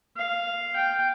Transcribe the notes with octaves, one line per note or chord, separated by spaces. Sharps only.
F5
G5